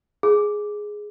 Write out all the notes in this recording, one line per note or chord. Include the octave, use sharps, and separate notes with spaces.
G#4